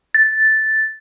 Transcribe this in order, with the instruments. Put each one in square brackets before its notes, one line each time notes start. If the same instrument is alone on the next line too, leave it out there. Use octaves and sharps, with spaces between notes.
[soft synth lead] A6